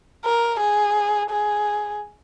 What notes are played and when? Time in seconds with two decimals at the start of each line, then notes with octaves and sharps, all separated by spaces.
0.25 A#4
0.60 G#4
1.30 G#4